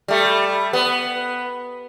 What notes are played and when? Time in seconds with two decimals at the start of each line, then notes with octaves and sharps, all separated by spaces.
0.08 G3 A3
0.73 B3